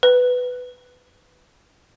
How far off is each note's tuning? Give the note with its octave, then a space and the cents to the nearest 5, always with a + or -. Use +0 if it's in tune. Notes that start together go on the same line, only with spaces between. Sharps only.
B4 +10